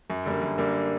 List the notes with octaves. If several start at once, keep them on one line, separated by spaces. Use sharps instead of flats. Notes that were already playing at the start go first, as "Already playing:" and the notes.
F#2
D3 G3 A#3
F#2
D3 G3 A#3